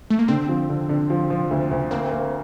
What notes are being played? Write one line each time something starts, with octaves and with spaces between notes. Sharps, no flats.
A3
A#3
D3 C4
F3
D3
D3
F3
F3
D2
D2
A#3 C4
A#3